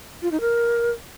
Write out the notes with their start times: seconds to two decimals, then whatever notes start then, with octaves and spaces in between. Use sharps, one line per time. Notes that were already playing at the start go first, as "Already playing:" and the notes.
0.22 F4
0.31 D#4
0.41 A#4